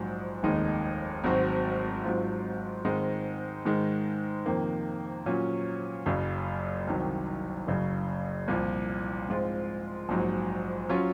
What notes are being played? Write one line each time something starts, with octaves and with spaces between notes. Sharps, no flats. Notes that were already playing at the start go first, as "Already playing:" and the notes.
Already playing: A#1 G#2 F#3
F1 D#2 D#3 G#3 D#4
G#1 G#2 F#3 C4 F#4
G#2 F#3 C4 F4
G#2 D#3 G#3 C4 D#4
G#2 D#3 G#3
F2 C3 D#3 A#3
A#2 F#3 C#4
F#1 F#2 C#3
C2 C3 D#3 F#3
F#1 F#2 C#3
C2 A#2 F3
G#2 F3 G#3 C4 F4
A#1 G#2 F#3
F#3 C#4 F4